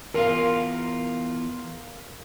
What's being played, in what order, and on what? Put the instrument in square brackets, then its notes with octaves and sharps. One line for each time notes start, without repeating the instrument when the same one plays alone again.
[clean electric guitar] E2 F4 [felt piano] A#4 F5